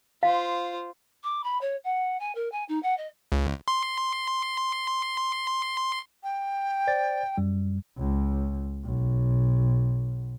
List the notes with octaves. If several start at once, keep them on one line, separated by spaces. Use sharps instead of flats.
F4 C5 F5
D6
B5
C#5
F#5
G#5
A#4
G#5
D#4
F#5
D#5
C#2
C6
G5
C5 D5 A6
F#2 G3
C#2
B1